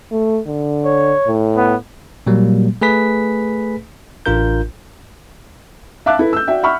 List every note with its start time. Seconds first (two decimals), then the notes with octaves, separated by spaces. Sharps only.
0.12 A3
0.47 D3
0.85 C#5
1.27 A2
1.56 B3
2.27 A#2 F#3 G3 A#3
2.81 A3 G#4 B4 B6
4.26 A1 D4 F4 A#4 G6
6.06 E5 F5 A5 D6 F#6
6.19 E4 A4 B4
6.33 E6 G6
6.48 F#4 D5 E5 G5
6.63 E5 F#5 B5 C#6 F6